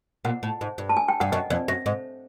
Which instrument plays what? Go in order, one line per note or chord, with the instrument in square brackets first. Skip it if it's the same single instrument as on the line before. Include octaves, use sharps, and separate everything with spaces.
[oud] A#2 [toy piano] F#5
[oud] A2
G#2
G2
[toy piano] A5
G#5
G5
[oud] G2 [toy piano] F#5
[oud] F#2 [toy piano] D#5
[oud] F2 [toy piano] D5
[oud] F#2 [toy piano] E5
[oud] G#2